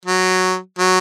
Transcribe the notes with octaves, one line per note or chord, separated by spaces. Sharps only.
F#3
F#3